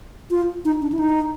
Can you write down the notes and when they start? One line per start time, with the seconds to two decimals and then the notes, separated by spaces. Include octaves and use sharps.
0.31 F4
0.65 D#4
0.82 D4
0.92 E4
0.99 D#4